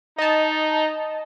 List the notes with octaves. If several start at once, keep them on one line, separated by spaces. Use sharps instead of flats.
D#4 D#5 A5